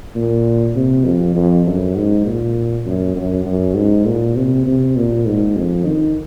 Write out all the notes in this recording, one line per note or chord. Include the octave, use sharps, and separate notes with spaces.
A#2
C3
F2
F2
F#2
G#2
A#2
F#2
F#2
F#2
G#2
A#2
C3
C3
A#2
G#2
F2
D#3